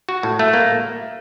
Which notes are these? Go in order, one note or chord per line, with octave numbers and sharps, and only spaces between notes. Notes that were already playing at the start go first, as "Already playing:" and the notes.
F#4
A2
A3
A#3